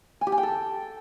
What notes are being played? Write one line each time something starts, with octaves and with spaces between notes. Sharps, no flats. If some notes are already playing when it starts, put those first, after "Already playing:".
G#5
G4
G#5
G5
A4